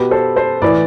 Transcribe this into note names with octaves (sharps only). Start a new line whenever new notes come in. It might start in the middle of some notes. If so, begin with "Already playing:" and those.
Already playing: B2 G4 B4
A4 C5
A4 C5
A2 E3 B4 D5